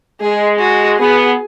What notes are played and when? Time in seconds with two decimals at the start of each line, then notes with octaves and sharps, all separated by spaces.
0.20 G#3 G#4
0.59 F#4
0.99 B3 G#4